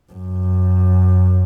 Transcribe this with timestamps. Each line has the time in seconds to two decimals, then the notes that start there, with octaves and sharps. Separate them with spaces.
0.12 F#2